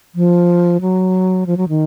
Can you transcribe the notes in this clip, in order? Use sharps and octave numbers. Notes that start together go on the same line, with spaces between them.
F3
F#3
F3
F#3
D#3